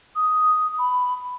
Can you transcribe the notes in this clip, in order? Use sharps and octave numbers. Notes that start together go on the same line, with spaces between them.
D#6
B5